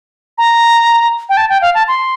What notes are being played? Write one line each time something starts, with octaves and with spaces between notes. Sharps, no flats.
A#5
G5
A5
G5
F5
A5
C6